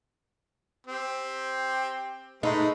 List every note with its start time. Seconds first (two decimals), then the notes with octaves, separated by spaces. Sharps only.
0.87 C4 G4
2.43 G#3 A3 D#4 B4